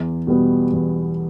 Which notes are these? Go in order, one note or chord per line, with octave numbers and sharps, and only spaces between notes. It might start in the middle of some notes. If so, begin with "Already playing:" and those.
Already playing: E2
B2 G3 B3
E2